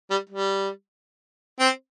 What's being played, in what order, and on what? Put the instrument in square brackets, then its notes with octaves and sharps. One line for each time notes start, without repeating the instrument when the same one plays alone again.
[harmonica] G3
G3
C4